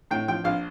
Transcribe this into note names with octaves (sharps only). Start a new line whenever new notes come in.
A2 G5
F3 G5
A#1 F5